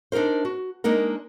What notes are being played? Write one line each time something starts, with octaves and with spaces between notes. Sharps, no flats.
D4 D#4 G#4 A#4 C5
F#4
G#3 A#3 D4 D#4 A#4